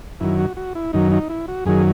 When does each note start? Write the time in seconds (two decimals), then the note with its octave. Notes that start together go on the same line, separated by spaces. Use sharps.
0.20 F#2 D#3 F#3 E4
0.39 F#4
0.57 F#4
0.75 E4
0.93 F#2 D#3 F#3 D#4
1.12 D#4
1.29 E4
1.48 F#4
1.66 F#2 D#3 F#3 G#4